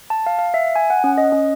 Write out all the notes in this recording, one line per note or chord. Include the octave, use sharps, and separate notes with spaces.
A5
F5
F5
E5
G#5
F#5
C#4
D#5
C#4